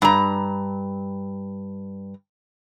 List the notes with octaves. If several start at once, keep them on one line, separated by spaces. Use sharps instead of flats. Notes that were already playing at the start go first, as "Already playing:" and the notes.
G2 A#5